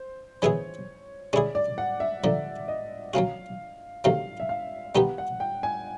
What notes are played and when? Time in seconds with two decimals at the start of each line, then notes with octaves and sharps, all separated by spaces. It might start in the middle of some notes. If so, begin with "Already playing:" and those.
Already playing: C5
0.42 E3 G#3 B3 E4 G#4 C#5
1.33 G#3 C#4 E4 G#4 D5
1.55 D5
1.78 F#5
2.00 E5
2.24 D3 F3 A#3 D5
2.68 D#5
3.14 F#3 A#3 C#4 F#4 F5
4.04 C3 D#3 F#3 A3 F5
4.40 E5
4.49 F5
4.95 D#3 G3 B3 D#4 G4 F#5
5.18 F#5
5.40 G5
5.63 G#5